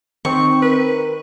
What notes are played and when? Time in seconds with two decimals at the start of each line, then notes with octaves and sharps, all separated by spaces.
0.25 D#3 C4 C#6
0.62 A#4 B4